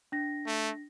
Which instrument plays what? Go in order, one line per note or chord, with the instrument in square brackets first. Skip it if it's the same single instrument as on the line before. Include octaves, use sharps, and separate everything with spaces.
[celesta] D4 A#6
[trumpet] A3